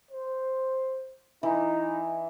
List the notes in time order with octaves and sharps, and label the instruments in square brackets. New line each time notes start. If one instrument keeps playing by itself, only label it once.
[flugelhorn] C5
[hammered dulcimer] E3 [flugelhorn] D#4